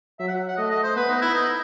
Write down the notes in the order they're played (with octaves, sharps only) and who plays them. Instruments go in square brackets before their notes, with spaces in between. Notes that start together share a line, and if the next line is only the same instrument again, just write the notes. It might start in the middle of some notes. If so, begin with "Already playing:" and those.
[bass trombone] F#3 [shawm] E5
[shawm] F#5
F#5
[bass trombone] A3 [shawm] D#5
[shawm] D#5
C5
[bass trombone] B3 [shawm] B4
[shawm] D#4
E4
D#4